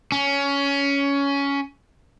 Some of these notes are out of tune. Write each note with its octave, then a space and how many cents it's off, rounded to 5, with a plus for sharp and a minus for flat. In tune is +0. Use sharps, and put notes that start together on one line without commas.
C#4 +15